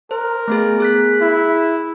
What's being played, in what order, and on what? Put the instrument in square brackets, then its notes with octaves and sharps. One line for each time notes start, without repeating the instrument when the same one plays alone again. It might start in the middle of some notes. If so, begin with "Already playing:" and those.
[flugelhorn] A#4 [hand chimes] C5
[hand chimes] A3 B3 G#4
G#4 F#6 B6
[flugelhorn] E4